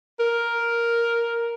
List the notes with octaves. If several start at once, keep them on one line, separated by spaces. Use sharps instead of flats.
A#4